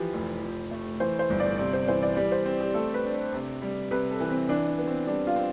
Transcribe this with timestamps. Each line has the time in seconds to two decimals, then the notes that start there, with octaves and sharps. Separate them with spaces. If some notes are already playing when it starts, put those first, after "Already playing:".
Already playing: E3 F3 G4
0.13 F1
0.42 F3
0.71 A3
1.00 E3 C5
1.19 C5
1.30 G1
1.40 D5
1.58 C3 D5
1.73 C5
1.88 E3 C5
2.03 D5
2.16 G3 D5
2.32 C5
2.46 C4
2.61 G4
2.74 A3 A4
2.94 B4
3.04 D4
3.33 C3
3.62 G3
3.91 C3 B4
4.11 A4
4.20 E3
4.30 C4
4.49 E3 D4
4.68 D4
4.78 B3
4.87 C4
5.07 G3 D4
5.27 F4
5.36 C4